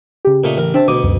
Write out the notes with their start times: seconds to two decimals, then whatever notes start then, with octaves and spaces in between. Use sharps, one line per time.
0.25 C#3 G4
0.44 A#2 A3 D#4
0.58 A1 A#4
0.74 C4 D4 E5 A5
0.88 D2 B2 D6 D#6
1.03 C#2 F#2